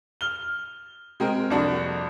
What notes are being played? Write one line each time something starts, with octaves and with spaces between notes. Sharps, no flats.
F6 G7
G#3 C4 A#4
C2 F2 A#3 D4 F#4